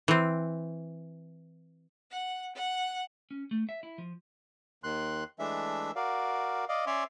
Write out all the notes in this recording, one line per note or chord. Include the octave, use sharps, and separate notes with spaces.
E3 C4
F#5
F#5
C#4
A3
E5
E4
F3
D#2 D#3 C6 F#6
E3 G#3 A3 D4 E5
F#4 A#4 D5 F5
D5 D#5 F5
C#4 C#5 D5 E5 C6